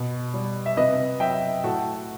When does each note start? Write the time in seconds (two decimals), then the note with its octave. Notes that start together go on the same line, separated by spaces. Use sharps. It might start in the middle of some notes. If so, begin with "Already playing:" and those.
Already playing: B2
0.34 G3
0.66 E5
0.77 C3 B4 D#5
1.20 F#3 E5 G5
1.64 A2 F#4 A4